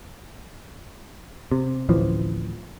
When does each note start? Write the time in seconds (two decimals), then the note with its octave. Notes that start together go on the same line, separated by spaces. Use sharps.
1.52 C3
1.89 D1 A1 E3 F3